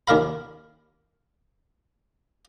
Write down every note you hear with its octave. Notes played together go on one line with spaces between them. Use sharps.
D#2 D#3 A#4 F5 B5